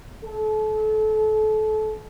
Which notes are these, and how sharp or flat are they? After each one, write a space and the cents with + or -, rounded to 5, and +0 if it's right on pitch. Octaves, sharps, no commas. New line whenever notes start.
A4 -30